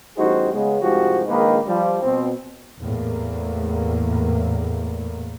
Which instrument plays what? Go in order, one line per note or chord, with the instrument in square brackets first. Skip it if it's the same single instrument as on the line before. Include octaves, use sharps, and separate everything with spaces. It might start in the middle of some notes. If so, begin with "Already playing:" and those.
[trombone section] A1 G3 D#4 F#4 G#4 C5
C#3 G#3 B3
C2 G#2 F3 F#4 G4
A#1 D#3 G#3 A#3 D#4 B4
F3 G3
B2 C4
[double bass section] E2 A2 A#3